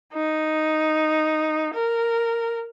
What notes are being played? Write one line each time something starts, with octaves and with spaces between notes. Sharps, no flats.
D#4
A#4